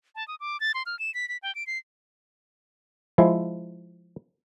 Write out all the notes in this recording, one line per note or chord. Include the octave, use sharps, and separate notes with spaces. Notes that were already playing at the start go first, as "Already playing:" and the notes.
A5
D#6
D6
A6
C6
F6
E7
B6
B6
G5
D7
C7
F3 G#3 E4